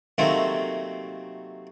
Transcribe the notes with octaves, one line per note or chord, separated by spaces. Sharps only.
C3 F#3 A3 A#3 C4 D#4